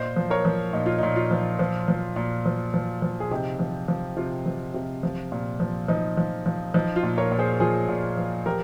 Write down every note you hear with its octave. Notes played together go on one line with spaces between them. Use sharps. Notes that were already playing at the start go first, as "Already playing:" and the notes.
Already playing: A#2 C5 D#5
F3
A#4 C#5
F3
A#2 D#4
F4
A#2 D#4
F4
F3
F3
F3
A#2
F3
F3
F3
G#4
C3 D#4 G4
F3
F3
C3 F4
F3
C3
F3
A#2
F3
F3 D#4
F3
F3
F3 D#4
F4
A#2
A#4 C#5
A#2
G#4 C5
F3 F4 G#4
A#2
F3
F3 G4 A#4